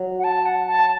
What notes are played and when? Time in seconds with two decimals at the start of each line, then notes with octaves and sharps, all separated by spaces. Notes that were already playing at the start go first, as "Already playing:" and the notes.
Already playing: F#3
0.19 F#5
0.24 A5
0.45 F#5
0.66 A5